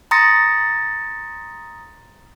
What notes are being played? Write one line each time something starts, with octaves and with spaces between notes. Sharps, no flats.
A#5 C6 D#6 A6 A#6 C#7